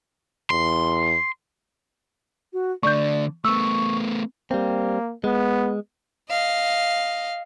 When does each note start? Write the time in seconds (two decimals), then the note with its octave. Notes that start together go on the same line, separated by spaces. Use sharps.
0.50 E2 C6
2.53 F#4
2.83 D3 A3 D5 C#6 G6
3.45 A3 B3 C#6 E6
4.51 G3 A#3 C4
5.24 G#3 B3
6.30 D#5 F5